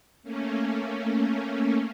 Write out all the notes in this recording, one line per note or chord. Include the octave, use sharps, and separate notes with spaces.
A3 A#3 C#4